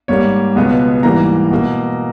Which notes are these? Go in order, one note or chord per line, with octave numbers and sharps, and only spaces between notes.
G#2 G3 A#3 C#5
C#2 B2 G#3 B3
G#2 E3 G3 A#3 A#5
B2 A#3